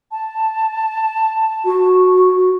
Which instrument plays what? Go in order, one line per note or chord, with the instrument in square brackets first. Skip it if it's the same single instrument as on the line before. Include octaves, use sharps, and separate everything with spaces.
[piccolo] A5
[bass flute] F#4